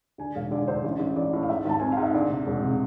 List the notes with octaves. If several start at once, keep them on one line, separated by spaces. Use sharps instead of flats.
D3 G#5
E1 F5
D3 D5
D5
D2 C5
A1
A1
A1 D5
A2
F5
G#2 E5
G#1 A5
C4 G#5
G#2 F5
E5
D2 D5
C3
E1
C3